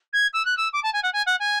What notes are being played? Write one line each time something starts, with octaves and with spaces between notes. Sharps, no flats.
G#6
E6
F#6
E6
D6
A5
G#5
F#5
G#5
F#5
G#5